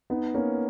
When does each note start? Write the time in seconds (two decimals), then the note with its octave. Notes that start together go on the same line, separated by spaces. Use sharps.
0.10 B3 D#4
0.34 A#3 C#4